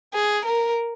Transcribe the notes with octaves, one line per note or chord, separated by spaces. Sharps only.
G#4
A#4